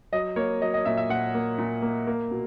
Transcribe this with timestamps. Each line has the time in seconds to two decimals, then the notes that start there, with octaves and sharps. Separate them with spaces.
0.12 F#3 D#5
0.36 A#3 C#5
0.61 F#3 D#5
0.74 D#5
0.85 A#2 E5
0.97 E5
1.09 A#2 F#5
1.34 A#3
1.58 A#2
1.82 A#3
2.07 A#3
2.31 B2